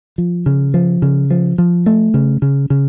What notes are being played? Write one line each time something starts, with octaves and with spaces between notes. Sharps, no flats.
F3
C#3
F3
C#3
F3
F3
A3
C#3
C#3
C#3